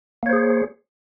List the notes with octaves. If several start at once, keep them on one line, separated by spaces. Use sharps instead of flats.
A#3 G#4 C5 C#5